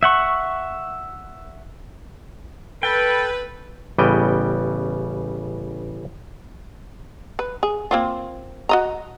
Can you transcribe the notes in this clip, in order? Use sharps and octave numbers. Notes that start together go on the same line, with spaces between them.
E5 F#5 C#6
A4 B4 G5
A1 C#3 G3 B3 D#5 G5
B4
G#4
A#3 C4 F4
F#4 D#5 A#5